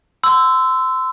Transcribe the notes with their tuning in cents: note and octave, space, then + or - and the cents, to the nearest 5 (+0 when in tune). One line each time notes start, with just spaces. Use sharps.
C6 -30 E6 +0